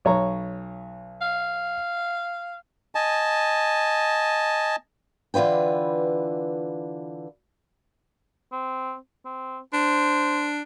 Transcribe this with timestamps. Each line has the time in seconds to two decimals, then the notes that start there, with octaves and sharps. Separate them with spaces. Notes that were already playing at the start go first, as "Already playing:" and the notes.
0.05 B1 C#5 A#5
1.21 F5
2.95 D#5 G#5 A5
5.34 D3 E3 F4 B4 G5
8.52 C4
9.25 C4
9.73 D4 C5